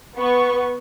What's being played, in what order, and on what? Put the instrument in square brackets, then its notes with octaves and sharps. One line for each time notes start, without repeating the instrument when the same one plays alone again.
[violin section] B3 C#6